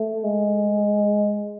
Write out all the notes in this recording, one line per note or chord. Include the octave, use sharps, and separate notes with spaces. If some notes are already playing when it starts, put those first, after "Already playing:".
Already playing: A3
G#3